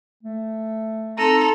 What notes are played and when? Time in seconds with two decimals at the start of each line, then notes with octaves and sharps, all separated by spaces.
0.23 A3
1.18 C4 D#4 A4 A#5 C6